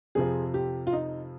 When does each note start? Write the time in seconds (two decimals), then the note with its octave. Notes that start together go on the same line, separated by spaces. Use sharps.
0.15 F2 C3 F3 G#4
0.54 G4
0.87 F4
0.93 D#4